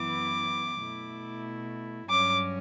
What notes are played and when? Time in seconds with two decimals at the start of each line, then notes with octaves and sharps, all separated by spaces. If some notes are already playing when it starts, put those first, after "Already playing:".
Already playing: F#2 E3 B3 E4 D6
0.82 B2 A3 E4
2.09 G2 F#3 C#4 D6